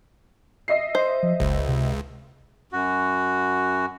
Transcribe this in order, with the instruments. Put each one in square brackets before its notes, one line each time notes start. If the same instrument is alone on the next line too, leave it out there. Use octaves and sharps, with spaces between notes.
[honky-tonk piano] D#5 E5 C7
[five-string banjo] C5
[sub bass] F3
[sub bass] F#1 [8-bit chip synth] C#2
[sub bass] C3
[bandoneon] F#2 F#4